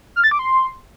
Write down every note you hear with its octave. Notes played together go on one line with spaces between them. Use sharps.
F6
A6
D6
C6